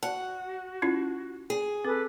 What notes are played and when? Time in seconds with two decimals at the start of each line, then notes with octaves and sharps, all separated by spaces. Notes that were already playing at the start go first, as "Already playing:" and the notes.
0.03 F#4 F#5 A5
0.82 C#4 E4 F4
1.50 G#4
1.85 C4 A4 B4 D6